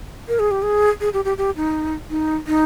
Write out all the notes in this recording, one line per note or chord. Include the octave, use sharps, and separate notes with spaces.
A#4
G#4
G4
G#4
G#4
G4
G4
G4
D#4
D#4
D#4